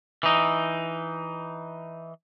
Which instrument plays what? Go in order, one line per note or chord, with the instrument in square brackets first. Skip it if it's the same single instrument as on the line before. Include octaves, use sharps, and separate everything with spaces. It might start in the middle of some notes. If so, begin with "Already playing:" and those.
[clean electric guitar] E3 D#4